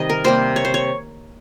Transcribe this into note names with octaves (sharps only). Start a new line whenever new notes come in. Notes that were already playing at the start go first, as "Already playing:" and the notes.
Already playing: C3 D#3 G3 D#5
A#4
C3 G3 A#3 C5
C#5
C5
C#5